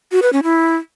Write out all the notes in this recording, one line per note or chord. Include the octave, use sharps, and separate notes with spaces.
F#4
B4
C#4
E4